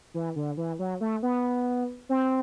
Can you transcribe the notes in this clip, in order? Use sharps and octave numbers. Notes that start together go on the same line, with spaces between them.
E3
D3
E3
F#3
A3
B3
C4